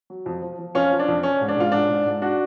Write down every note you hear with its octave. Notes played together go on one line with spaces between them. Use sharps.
F#3
F2
F3
F3
F2 C#4 F4
F3
D4
F2
F3 C#4
G#2
D4
G#2 F4
G#2 D4
G#2
G#2
D4 F#4